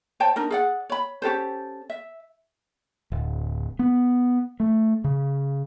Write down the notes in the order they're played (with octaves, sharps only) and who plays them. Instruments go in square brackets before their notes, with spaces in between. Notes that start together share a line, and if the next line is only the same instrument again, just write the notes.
[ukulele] C5 C#5 G5 A5
D4 D#4 A#4
G#4 D5 F#5
C#5 B5
C#4 G4 A4 C5
E5
[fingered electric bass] D1
B3
A3
C#3